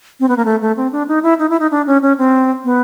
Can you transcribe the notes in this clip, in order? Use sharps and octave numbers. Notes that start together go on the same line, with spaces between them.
C4
B3
A#3
A3
A3
C4
D4
D#4
E4
D#4
E4
D#4
D4
C#4
C#4
C4
B3